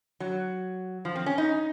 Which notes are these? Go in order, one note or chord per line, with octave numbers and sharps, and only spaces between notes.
F#3
F3
C4
C#4
D#4